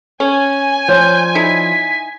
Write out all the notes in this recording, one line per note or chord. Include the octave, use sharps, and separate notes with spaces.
C#4 G#5
F3 C#5 D5 G6
D#4 E4 B6